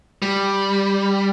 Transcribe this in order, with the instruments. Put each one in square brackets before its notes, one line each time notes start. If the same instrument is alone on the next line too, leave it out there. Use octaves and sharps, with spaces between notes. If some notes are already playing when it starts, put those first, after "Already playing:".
[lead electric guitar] G3